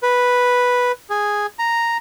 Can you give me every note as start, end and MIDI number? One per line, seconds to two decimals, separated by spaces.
0.03 0.92 71
1.10 1.46 68
1.59 1.97 82